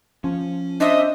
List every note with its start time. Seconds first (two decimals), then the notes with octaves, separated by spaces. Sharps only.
0.24 F3 C#4
0.80 D4 C5 D#5 E5